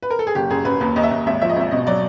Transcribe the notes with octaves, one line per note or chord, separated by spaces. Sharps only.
B4
A#4
A4
G#4
F#1 G4
F#2 G#4
F#2 B4
D#2 B4
D#2 D#5
E5
D#2
G#1 E5
F3 E5
D#5
G#1 E5
B2 D#5
F#3 D5